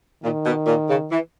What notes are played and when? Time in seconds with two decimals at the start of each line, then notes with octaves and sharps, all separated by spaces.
0.24 A#2 D#3
0.45 B2
0.67 A#2
0.89 C#3
1.11 E3